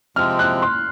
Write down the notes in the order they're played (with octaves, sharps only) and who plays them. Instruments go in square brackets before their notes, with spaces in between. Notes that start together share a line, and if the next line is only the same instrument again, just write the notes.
[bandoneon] C3 F3 G#3 C4 [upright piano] F6
[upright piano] F#6
C6